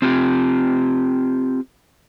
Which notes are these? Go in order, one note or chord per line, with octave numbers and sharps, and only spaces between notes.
C4 F4 G4